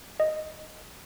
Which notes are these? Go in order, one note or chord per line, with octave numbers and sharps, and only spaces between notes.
D#5